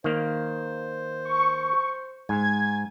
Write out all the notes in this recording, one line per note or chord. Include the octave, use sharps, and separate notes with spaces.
D#3 A#3 C5 F5
C#6
G#2 G#5 G#6